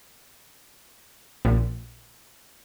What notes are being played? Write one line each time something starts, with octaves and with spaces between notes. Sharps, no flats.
A#1